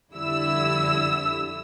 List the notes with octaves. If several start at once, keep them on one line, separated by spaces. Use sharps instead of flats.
F2 D3 G3 E4 E6